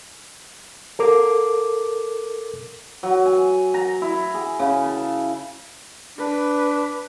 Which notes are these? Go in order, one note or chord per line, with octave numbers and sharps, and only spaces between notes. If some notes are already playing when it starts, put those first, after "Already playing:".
A4 A#4 D6
F#3
G#5
A#5
E4
G#4
C#3
A5
D4 B4